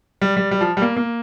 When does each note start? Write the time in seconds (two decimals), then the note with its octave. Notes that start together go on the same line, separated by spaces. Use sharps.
0.22 G3
0.37 G3
0.51 G3
0.61 F3
0.77 G3
0.82 A#3
0.96 A#3